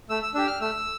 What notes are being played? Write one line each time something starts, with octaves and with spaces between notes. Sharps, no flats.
A3 E6
E6
D4 G4 E6
F6
A3 E6